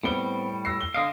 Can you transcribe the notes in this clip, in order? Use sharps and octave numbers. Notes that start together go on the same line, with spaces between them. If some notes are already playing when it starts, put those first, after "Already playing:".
A2 G3 B3 C4 G7
E6 A#6 C7
G7
D3 D#5 F5